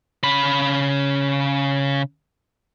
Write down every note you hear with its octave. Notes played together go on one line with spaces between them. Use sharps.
C#3 B5